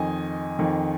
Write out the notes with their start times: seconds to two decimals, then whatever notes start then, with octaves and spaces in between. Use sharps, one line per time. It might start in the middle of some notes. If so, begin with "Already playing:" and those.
Already playing: F2 D#3 D#5 G#5
0.59 F2 D#3